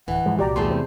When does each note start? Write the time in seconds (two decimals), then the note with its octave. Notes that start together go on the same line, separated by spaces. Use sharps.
0.08 D1 G2 E3 F#5
0.26 G#2 F3 G#3
0.39 C2 A#2 F#4 G4 D5 A#5
0.56 E2 G3 A3 G#4 A5 C6
0.71 C3 C5